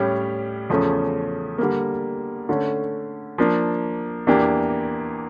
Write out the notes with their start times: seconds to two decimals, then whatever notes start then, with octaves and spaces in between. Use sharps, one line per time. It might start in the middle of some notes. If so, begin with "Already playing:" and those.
Already playing: A2 G3 C#4 G4
0.70 E2 C#3 F3 A3 C#4
1.58 D3 G3 A#3
2.49 D3 A3 C#4
3.38 F3 A#3 D4
4.27 E2 E3 A#3 D4 G4